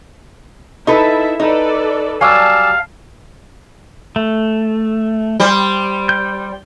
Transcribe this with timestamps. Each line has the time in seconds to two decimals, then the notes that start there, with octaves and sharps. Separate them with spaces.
0.87 D#4 E4 A4 B4 E5
1.40 D#4 A4 B4 D5
2.21 F#3 G3 F5 G#5 A5 D6 E6
4.16 A3
5.40 G3 C5
6.09 G6